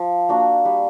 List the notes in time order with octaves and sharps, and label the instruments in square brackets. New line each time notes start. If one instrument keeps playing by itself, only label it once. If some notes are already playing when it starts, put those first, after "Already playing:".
Already playing: [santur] F3
A#3 D4 F#4
G3